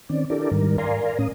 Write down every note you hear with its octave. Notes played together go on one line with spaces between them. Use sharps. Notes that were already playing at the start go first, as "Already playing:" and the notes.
D#3 C4 C#4 D5
D4 E4 G4 A4 A#4 D5
G#2 D#3 G3 A#4
A#4 D5 F5 G#5 A#5 C6
A2 C#4 D#6